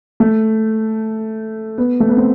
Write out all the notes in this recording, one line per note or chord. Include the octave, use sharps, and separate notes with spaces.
A3
B3
A3
B3
C4